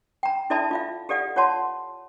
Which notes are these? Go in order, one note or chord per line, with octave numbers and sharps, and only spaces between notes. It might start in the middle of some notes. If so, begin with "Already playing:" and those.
G5 A#5
E4 A4 D5 E5 A5 B5
F4 E5 F5
G4 A4 D5 F5 F#5
F4 C#5 F#5 A5 C6